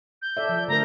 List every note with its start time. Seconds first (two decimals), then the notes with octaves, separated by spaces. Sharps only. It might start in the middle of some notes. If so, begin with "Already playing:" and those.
0.22 G6
0.37 A4 D5 E5
0.49 F3
0.68 D3 A3 A#4 A#5